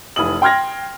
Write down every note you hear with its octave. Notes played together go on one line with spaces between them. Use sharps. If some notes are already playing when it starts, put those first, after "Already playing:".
F1 E3 D#6 F#7
G5 C6 F6 G#6 A#6